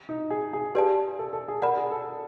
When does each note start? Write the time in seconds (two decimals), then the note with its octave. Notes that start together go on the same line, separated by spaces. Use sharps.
0.09 D#4
0.30 G#4
0.53 G#4
0.75 G4 G#4 B4 D5 F5 A5
1.19 A4
1.33 A4
1.48 G#4
1.62 A#4 D5 F#5 B5
1.77 G#4
1.92 A4